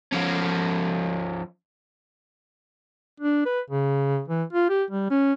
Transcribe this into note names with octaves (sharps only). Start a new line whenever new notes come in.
F3 C#4
D4
B4
C#3
E3
F4
G4
G3
C#4